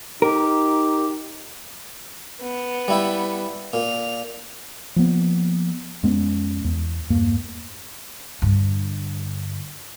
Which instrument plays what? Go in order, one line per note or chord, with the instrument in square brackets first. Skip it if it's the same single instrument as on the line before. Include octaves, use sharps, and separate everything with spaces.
[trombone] D#4 [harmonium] G4 [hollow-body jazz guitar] A#4
[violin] B3
[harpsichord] G3 E4 G5
[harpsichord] A#2 [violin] F7
[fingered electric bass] F3 A#3 B3
F2 G#3 B3 C#4
E2
E2 G2 A#3
[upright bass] G2 D3